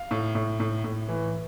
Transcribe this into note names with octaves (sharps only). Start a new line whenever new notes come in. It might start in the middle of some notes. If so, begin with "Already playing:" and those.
Already playing: F5
A2
A2
A2
A2
E3